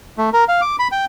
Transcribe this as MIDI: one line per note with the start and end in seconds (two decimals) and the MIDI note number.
0.18 0.30 57
0.33 0.44 70
0.48 0.61 77
0.61 0.76 86
0.79 0.88 83
0.92 1.05 79